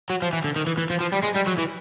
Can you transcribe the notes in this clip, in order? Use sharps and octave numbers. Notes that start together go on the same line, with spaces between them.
F#3
F3
E3
D3
D#3
E3
E3
F3
F3
G3
G#3
G3
F#3
E3